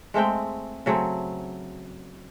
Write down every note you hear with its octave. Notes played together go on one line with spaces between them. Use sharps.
G#3 A3 C4 G5
C#3 F#3 A3 C4